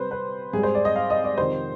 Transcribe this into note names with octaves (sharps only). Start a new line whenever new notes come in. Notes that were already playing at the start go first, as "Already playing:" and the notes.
Already playing: C3 G3 B4 C5
B4
G#2 G3 G#4
C5
D5
D#5
F5
D#5
D5
F2 C3 D#3 C5